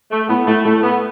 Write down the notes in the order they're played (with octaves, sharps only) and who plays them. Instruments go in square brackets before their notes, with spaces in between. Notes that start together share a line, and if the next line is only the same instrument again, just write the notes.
[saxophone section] A3
[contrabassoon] A2 [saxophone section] B3
[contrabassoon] A2 [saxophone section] A3
[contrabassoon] A2 [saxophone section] A3
[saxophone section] B3